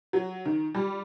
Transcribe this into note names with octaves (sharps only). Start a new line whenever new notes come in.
F#3
D#3
G3